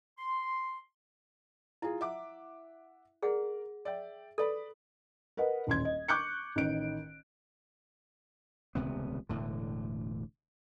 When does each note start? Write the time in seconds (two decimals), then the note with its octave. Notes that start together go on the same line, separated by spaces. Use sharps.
0.18 C6
1.82 E4 F4 G#4
2.01 E5 F#5 D6
3.22 G#4 A#4 D5 F#5
3.85 D5 E5 G5
4.38 A4 B4 D5 B5
5.37 A#4 B4 D#5 F#5
5.67 D#1 A1 C6 G#6
5.85 D#5
6.08 C#6 D6 F#6 G6 C#7
6.56 A1 D#3 D7
8.75 D#1 C#2 C3 B3
9.29 E1 A2 D3